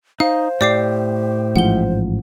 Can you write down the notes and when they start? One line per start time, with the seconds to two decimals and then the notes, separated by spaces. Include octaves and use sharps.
0.20 D#4 C5 F5
0.61 A2 G4 D5 D6 C7
1.56 A1 G#2 F3 F#5 G7